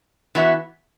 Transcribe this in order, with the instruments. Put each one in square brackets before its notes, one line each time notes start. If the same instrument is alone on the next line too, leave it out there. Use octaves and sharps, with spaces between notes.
[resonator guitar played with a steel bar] E3 B3 F#4 E5